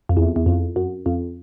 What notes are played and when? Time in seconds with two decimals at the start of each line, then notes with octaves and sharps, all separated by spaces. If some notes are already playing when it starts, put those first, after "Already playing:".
0.09 F2
0.17 E2
0.36 E2
0.46 F2
0.76 F#2
1.06 F2